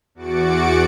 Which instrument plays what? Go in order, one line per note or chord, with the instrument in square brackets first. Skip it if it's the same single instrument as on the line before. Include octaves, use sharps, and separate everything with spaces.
[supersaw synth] E2 F#4 D6 A6 C#7 D7